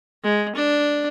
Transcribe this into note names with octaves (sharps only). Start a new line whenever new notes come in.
G#3
D4